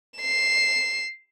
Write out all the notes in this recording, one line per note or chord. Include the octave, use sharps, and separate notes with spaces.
C7 E7